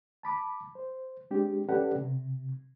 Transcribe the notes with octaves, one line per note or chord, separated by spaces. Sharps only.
A5 B5 D6
C5
G#3 C4 D4 G4
C#4 G4 A4 B4 D5 F#5
C3